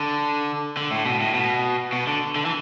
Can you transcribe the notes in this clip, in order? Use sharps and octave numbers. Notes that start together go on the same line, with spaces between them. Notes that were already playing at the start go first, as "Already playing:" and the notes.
Already playing: D3
D3
A2
B2
A2
B2
B2
D3
D3
E3